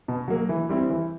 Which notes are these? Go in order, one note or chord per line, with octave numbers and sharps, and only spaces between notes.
B2
F#3 A#3
E3
G3 C4 E4
E3